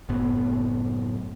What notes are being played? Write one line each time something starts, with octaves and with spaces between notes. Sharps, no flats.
F#1 F#2 A2 B3